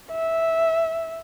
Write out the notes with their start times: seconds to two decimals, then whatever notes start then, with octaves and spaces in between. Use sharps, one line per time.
0.11 E5